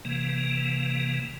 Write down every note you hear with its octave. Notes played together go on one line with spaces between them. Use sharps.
C3 E3 A#3